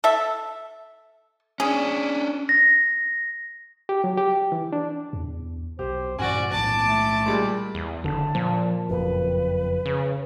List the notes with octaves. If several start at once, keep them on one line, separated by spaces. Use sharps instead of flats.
A4 E5
C#4 D4 G#4
A#6
G4
F#3
G4
E3
D4
E2
B1 G4 C5
G2 A#2 E3 C#4 F#4 D5 G#5
B1 A2 B3 A5 D6
A3
A#2 G3 G#3
E2
F#1 D3 A5
A#2 F3
F#1 F2 B4
C#3